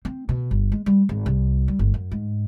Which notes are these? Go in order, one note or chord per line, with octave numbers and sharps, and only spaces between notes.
C4
B2
G1
G#3
G3
G#1
C2
G3
G1
F#2
G#2